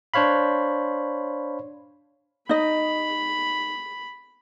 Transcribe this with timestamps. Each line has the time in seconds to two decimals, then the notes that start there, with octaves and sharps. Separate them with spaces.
0.14 D4 C5 C#5 F5 B5
2.49 D#4 D#5 B5